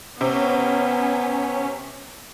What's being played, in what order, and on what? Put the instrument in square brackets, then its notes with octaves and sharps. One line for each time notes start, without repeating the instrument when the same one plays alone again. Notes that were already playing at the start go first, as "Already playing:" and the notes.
[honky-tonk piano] C3 [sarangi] B3 [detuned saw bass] C#4